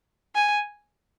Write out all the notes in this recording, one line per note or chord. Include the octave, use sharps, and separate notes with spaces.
G#5